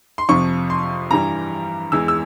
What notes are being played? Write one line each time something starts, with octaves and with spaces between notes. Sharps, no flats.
C6
F2 C3 F3 C#6
C6
G2 E3 G3 A#5
E2 E3 G#3 E6
E6